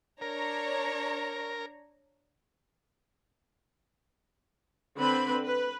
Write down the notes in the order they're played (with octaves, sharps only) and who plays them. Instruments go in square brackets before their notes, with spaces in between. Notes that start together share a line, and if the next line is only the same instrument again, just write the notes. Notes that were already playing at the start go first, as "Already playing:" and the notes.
[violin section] D4 C#5 A#5 [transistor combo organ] A#4
[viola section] D3 C4 B4 B5
B4